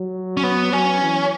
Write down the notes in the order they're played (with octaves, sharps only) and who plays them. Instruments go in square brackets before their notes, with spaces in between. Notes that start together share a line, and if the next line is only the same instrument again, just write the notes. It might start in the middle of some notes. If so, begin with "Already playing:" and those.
Already playing: [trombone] F#3
[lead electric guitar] C#4
B3
[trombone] F#3 [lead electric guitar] C#4
[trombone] E3